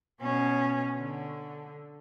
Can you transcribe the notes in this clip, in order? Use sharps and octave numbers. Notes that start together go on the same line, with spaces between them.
B2 C#4
D3